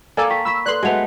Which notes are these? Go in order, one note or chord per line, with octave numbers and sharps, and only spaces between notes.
A#3 A4 D5 G#5
G5 C#6 B6
B5 C#6 E6 B6
A4 B4 D5 C6 F#6
G#3 A3 B3 F#4 F#5 F7